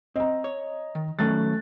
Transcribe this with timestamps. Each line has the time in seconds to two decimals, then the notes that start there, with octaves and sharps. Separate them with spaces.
0.16 C4 D#5 A#5
0.44 C#5
0.95 D#3
1.19 D#3 F#3 A3 C#4 F#6 A6